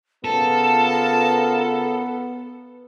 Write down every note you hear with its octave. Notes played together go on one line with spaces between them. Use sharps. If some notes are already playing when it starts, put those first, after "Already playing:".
C#3 B3 F4 A4 A#4 A5